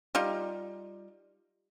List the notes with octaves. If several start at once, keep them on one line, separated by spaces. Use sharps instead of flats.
G3 D#4 F4